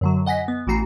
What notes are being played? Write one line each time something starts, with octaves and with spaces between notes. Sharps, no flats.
F#2 D3 F#3
D#5 F#5 G#5 A#6 B6
B3
A1 E3 A3 F#4 A#5 C7